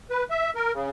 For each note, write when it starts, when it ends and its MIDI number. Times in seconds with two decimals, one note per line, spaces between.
0.10 0.24 71
0.30 0.50 76
0.56 0.72 70
0.74 0.90 49